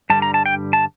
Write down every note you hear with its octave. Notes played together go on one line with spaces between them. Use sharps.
G2 D3 G3 A5
A#5
A5
G5
A5